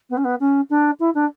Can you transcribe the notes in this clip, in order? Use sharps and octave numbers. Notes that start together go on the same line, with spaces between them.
B3
C#4
B3
C#4
D4
E4
D4